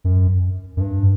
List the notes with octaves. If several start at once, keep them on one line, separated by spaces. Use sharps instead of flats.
F#2
F#2
G2